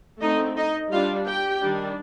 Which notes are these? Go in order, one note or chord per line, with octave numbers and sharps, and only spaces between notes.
D3 A3 C4 D#4 D#5
D#4 D#5
G3 D4 F4 F5
G4 G5
D#3 G3 D4